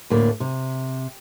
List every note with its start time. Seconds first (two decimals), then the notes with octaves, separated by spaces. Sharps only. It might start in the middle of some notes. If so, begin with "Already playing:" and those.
0.10 D2 A2 A#3 D4
0.40 C3